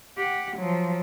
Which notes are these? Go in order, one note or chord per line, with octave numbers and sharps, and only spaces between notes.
G4 F#5
F3 F#3